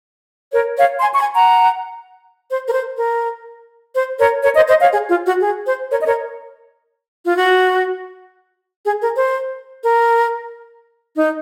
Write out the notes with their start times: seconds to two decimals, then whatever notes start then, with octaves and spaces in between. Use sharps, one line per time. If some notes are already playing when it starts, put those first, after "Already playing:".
0.52 A#4 C#5
0.76 C#5 F5
1.00 G#5 C6
1.14 C#6
1.17 G#5 C6
1.34 F#5 A#5
2.49 C5
2.67 A#4
2.73 C5
2.97 A#4
3.95 C5
4.19 A#4 C#5
4.43 A#4 C#5
4.55 C5 D#5
4.68 C5 D#5
4.80 C#5 F5
4.92 G#4
5.10 F4
5.26 F#4
5.41 G#4
5.66 C5
5.90 A#4 C#5
6.00 D#5
6.06 A#4 C#5
7.26 F4
7.38 F#4
8.85 G#4
9.01 A#4
9.17 C5
9.82 A#4
11.17 D#4